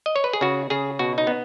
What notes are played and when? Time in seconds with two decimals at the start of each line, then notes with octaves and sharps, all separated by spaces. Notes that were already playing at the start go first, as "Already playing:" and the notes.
0.06 D#5
0.16 C#5
0.24 B4
0.33 G#4
0.41 C#3 F#4
0.70 C#3 G#4
0.99 B2 F#4
1.18 D#4
1.27 B3